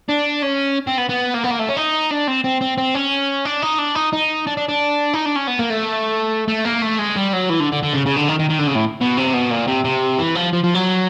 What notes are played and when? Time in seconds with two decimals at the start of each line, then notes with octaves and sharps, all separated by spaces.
0.09 D4
0.42 C#4
0.87 C4
0.98 B3
1.10 B3
1.35 A#3
1.44 B3
1.51 A#3
1.60 A3
1.69 C#4
1.77 D#4
2.11 D4
2.27 C4
2.44 C4
2.61 C4
2.78 C4
2.95 C#4
3.45 D4
3.62 D#4
3.78 D4
3.95 D#4
4.13 D#4
4.47 D4
4.57 D4
4.68 D4
5.13 D#4
5.25 D4
5.36 C#4
5.47 B3
5.59 A#3
5.70 A3
6.48 A3
6.65 A#3
6.82 A3
6.99 G#3
7.16 G3
7.33 F#3
7.49 E3
7.60 D3
7.72 D3
7.83 D3
7.94 C#3
8.06 C#3
8.16 D3
8.28 D#3
8.39 D#3
8.50 D#3
8.59 D3
8.67 C#3
8.75 A2
9.01 B2
9.18 C3
9.34 B2
9.51 A#2
9.68 C3
9.84 C3
10.18 E3
10.35 F3
10.53 F3
10.64 F3
10.74 F#3